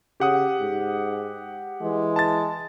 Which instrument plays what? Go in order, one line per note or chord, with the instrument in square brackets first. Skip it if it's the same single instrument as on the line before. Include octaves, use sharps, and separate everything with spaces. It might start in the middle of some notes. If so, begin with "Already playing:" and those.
[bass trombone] C#3 [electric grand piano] G4 F#5 D#6
[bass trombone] G#2
[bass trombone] E3 [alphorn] G#3
[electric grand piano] A5 A6